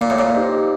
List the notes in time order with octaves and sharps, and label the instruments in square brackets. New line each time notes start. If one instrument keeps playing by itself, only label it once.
[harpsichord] A#2 [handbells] A#3
[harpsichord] A2
A#2
[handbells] D#4 G4 C5 D#5